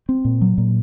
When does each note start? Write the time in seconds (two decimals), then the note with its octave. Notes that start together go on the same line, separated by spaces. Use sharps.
0.09 C4
0.25 A#2
0.41 F#3
0.58 A#2